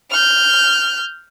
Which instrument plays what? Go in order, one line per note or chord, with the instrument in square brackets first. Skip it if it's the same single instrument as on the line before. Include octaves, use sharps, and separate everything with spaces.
[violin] F6 G6